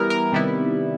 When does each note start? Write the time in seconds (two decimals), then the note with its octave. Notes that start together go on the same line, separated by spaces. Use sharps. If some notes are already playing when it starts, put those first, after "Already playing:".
Already playing: E3 G3 B3 E4 A#4
0.10 A#4
0.32 C3 D#3 G3 B3 E4